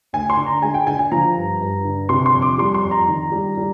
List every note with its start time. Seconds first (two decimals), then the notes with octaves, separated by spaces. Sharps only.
0.13 D2 G#5
0.30 C6
0.37 D3
0.46 A#5
0.62 G#3 G#5
0.74 G5
0.87 D3 G#5
0.99 G#5
1.12 F3 A#5
1.37 G2
1.61 G2
1.85 D3
2.09 C3 C6
2.26 C6
2.34 F2
2.42 D6
2.58 G3 C6
2.74 C6
2.84 F2
2.91 A#5
3.08 D#3
3.32 G3
3.57 G3